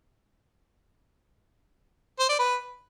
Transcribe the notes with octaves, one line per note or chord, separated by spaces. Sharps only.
C5
D5
B4